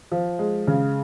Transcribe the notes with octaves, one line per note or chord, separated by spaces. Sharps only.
F3
G#3
C#3